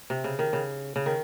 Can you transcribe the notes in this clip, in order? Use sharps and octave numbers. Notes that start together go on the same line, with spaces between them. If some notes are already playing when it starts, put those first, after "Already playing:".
C3
C#3
D#3
C#3
C#3
D#3